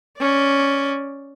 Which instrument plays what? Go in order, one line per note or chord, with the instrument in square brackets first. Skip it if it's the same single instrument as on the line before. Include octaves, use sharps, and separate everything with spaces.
[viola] C#4 D5